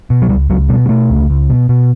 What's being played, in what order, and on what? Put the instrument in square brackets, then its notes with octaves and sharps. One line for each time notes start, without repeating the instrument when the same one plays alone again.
[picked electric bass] B2
F#3
C#2 G3
C#2 F#3
B2 G3
G3
B2 A3
C#2
C#2
B2
B2